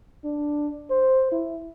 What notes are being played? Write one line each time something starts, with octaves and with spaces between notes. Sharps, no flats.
D4
C5
E4